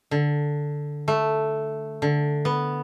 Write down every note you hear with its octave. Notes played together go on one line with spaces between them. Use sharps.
D3
A3
D3
B3